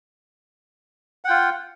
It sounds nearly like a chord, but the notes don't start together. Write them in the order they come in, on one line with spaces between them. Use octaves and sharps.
F#5 G5 F4